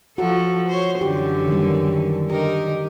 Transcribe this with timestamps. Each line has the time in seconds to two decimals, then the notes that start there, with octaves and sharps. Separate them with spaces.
0.18 F3 F#4 A4
0.68 C5 C#5
1.01 F#2 D3 E3 G4
1.48 D#3 G3
2.30 D3 D#4 G4 A#4